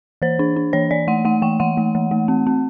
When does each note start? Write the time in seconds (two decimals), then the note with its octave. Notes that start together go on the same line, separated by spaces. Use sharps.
0.22 E3 C5
0.39 D4
0.56 D4
0.73 E3 C#5
0.91 E3 D5
1.07 A3 F#5
1.25 A3 F#5
1.42 E3 G5
1.60 E3 F#5
1.77 A3
1.95 E3
2.11 A3
2.28 C4
2.47 C4